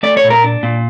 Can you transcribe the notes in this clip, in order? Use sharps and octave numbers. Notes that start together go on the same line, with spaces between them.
A3 D5
C#5
A#2
A#4
D4
A#2